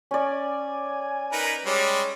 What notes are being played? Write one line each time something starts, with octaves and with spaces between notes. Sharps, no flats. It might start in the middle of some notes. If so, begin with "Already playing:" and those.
C#4 D5 G#5
D#4 A#4 B4
G3 G#3 C#5